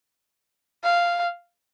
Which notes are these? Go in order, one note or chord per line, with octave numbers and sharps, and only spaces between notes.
F5